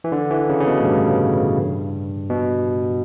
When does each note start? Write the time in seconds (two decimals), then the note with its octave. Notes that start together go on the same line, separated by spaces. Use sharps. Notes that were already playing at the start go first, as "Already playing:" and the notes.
0.04 E3
0.12 D3
0.31 E3
0.49 C#3
0.60 C#3
0.67 B2
0.80 A2
0.85 G2
2.30 B2